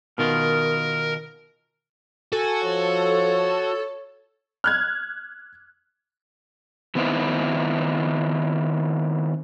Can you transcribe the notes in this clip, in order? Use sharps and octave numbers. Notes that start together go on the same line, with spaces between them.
B2 D#3 F4 A#4
F#4 A4 G#5
F3 C#5
F6 F#6 G#6
D#3 B3 C4 D#4 E4